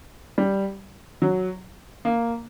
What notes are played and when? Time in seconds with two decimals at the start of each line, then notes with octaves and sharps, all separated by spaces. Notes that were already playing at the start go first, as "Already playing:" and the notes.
0.38 G3
1.22 F#3
2.05 A#3